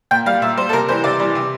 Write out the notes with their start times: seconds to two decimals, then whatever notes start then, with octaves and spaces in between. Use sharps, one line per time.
0.11 A#2 G5
0.26 G3 F5
0.42 A#2 E5
0.57 G3 C5
0.69 A4
0.73 C3 A#4
0.89 E3 G3 C5
1.04 C3 D5
1.20 E3 G3
1.35 C3